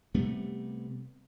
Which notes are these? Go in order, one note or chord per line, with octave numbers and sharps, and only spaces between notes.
C3 G3 A3 B3